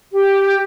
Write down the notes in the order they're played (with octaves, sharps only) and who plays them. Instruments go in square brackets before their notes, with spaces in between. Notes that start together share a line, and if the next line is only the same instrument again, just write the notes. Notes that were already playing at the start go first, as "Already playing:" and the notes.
[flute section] G4